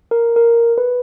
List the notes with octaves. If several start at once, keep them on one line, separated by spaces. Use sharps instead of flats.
A#4
A#4
B4